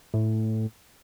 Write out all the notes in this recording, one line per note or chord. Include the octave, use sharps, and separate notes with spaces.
A2